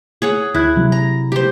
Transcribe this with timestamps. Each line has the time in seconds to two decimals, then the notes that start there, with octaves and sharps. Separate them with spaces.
0.22 G#4 C#5 F#5
0.55 D2 E4 F#6 G#6
0.76 C3 F#3
0.92 A#5
1.32 G4 C5